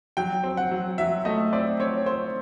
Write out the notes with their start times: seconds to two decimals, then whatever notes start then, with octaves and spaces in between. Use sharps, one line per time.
0.17 F#3 G5
0.44 C4
0.57 F#5
0.71 F#3
0.98 F#3 E5
1.25 A3 D#5
1.53 C4 D5
1.80 C4 C#5
2.06 C4 C5